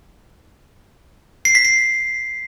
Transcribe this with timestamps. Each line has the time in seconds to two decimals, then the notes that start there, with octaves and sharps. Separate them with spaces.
1.45 C7
1.55 B6
1.65 C7